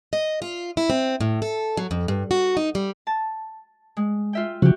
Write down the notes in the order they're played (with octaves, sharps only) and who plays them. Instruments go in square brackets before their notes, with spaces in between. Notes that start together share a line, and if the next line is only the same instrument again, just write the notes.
[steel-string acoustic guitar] D#5
F4
E4
C4
A2
A4
F#3
F2
G2
F#4
D#4
G3
[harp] A5
G#3
F4 E5 G5
[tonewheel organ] C#3 F3 [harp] F#4 G4